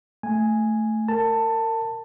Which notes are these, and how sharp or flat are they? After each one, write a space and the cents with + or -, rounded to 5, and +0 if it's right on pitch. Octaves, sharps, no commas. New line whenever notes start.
A3 +0 G#5 +0
A#4 -30 A5 +15